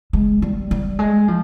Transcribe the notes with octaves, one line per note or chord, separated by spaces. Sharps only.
G#3
G3
G3
G#3
F3